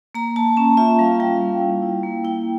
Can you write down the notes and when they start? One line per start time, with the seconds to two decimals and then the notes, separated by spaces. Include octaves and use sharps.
0.15 A#3 A#5
0.36 A#3 A5
0.57 C#4 A5
0.77 F4 E5
0.99 G3 F5
1.20 G3 G5
1.41 A#3
1.61 E4
1.82 E4
2.03 A#3
2.24 E4 G5